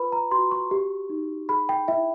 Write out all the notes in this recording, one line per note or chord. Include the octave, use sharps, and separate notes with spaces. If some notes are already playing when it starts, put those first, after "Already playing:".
Already playing: F4 B4 B5
A#5
F#4 C6
C#6
G4
D#4
G#4 B5
G5
E4 E5